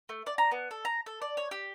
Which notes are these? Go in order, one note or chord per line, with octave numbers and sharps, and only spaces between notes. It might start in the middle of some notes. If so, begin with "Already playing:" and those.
A3
D5
A#5
B3
A4
A#5
A4
D5
C#5
G4